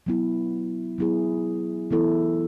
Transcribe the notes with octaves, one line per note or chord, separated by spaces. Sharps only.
F#3 B3 E4
F#3 B3 E4 G#4
E3 B3 E4 A4